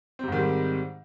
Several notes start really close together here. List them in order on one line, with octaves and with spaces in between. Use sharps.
C4 C3 G#2 D#3 G3